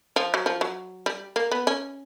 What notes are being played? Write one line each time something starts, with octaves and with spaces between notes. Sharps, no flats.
F3
F#3
F3
F#3
G3
A#3
B3
C#4